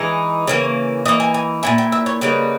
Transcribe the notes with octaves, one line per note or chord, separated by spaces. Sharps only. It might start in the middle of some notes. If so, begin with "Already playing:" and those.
Already playing: E3 G#3 D#4
C#3 E3 A#3 C#5
E3 A#3 D#4 D#5
G#5
G#5
A#2 A#3 E4 G#5
G5
E5
C#5
C#3 G3 A#3 D#4 B4